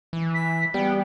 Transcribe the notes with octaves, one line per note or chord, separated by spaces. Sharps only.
E3
B6
G3 B3 G5